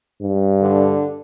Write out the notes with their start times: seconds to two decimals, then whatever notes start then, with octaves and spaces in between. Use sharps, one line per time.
0.22 G2
0.61 D3